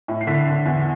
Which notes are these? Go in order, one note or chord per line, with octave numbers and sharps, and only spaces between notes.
A2
C7
D3 B6
D3
E2